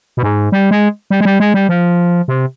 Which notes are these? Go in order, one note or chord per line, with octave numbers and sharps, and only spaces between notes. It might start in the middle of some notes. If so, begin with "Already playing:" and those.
B2
G#2
G3
G#3
G3
G#3
G3
G#3
G3
F3
C3